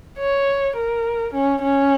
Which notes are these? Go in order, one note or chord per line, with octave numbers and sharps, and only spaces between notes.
C#5
A#4
C#4
C#4